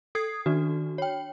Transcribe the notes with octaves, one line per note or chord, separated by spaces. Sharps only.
A4 D#6 G#6 C7
D#3 D4 F#4
C#5 G5